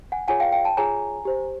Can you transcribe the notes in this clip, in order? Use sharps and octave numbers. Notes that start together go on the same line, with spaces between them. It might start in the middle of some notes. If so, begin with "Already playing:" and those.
F#5 G#5
F4 G#4 C#5 F#5 G#5
F5 G5
F5 G5
G5 A5
F4 G#4 C#5 G#5 A#5
G4 C5